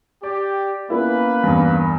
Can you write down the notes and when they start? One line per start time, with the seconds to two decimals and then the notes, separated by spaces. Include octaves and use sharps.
0.23 G4 D5
0.90 A#3 B3 C#4 E4 B4
1.44 E2 G2